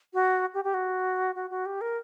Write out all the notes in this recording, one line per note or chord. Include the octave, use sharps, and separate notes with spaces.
F#4
G4
G4
F#4
F#4
F#4
G4
A#4